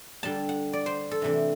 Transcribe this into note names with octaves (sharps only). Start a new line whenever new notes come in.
D3 G3 D4 A5
F#5
D5
C5
A4
C3 E3 A3 D4